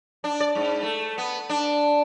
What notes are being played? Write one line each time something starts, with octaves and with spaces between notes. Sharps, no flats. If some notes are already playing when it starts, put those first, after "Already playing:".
D4
D5
G#2
A3
B3
D4